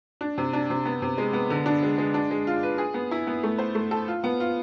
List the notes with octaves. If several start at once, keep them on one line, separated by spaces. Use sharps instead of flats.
D4
C3
D4
C3
B3
C3
G#3
B3
D3
D4
G#3
G#3
D4
G#3
F4
B4
G#4
B3
E4
B3
A3
C5
A3
A4
F4
B3
F4